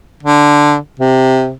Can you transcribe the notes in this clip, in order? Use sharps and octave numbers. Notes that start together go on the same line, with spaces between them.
D3
C3